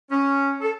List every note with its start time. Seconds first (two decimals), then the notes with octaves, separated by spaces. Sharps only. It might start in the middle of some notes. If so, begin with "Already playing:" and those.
0.09 C#4
0.61 A4